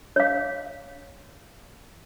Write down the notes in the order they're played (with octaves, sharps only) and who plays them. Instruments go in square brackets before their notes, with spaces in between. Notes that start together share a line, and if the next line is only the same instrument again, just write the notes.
[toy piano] C#5 F5